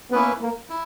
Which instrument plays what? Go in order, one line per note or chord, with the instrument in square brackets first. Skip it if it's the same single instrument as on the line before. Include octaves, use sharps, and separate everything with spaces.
[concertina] A#3 C#4 E4 B4 [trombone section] B3
[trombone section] A#3
[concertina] E4